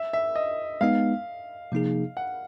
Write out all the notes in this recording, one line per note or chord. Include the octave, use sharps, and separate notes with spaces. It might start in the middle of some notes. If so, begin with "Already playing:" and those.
Already playing: E5
E5
D#5
G#3 B3 D#4 F5
C3 F3 A#3 D#4 G#4
F#5